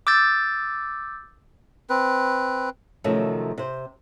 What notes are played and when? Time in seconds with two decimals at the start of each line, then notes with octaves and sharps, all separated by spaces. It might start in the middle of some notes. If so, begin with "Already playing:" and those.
0.07 D6 E6 G6 A6
1.90 C4 B4
3.04 C3 D#3 F3 F#3 A3 C#4
3.58 C3 C5